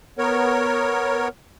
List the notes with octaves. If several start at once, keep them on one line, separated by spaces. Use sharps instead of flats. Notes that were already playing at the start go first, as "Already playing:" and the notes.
B3 A#4 C#5